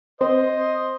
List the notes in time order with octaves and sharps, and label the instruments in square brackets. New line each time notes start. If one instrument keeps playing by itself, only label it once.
[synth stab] C4 [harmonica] C5 [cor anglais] D#5